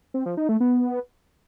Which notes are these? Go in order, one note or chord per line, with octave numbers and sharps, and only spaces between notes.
C4
F3
D#4
A3
B3